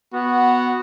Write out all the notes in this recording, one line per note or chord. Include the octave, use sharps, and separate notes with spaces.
B3 F#4